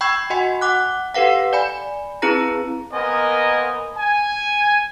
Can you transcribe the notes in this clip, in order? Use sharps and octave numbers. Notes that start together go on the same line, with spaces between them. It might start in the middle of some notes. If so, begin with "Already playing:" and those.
G5 B5 C#6 E6 G6 G#6
F#4 D#5 F#5 G#5 C6
F#5 D6 F#6
G4 A4 B4 F5 F#5
D5 G#5 B5
C4 E4 G#4 B4 A#5 A#6
A#3 B3 A#4 C5 D#5 G#5
G#5